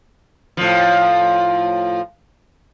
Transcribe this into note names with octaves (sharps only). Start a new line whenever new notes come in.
A2 F3